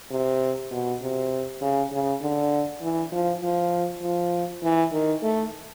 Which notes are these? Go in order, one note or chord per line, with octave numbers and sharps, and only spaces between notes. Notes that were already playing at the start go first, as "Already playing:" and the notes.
C3
B2
C3
C#3
C#3
D3
E3
F3
F3
F3
E3
D#3
A3